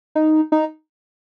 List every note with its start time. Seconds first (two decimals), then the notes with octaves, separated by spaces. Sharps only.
0.15 D#4
0.52 D#4